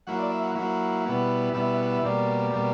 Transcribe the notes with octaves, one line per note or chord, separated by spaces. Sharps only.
F#3 A#3 E4 F#5
D5
E5
F#5
F#3 A#3 E4 F#5
B2 G3 B3 E4
B2 G3 B3 E4 E5
E5
F#5
E5
B2 G3 A#3 D5
B2 G3 A#3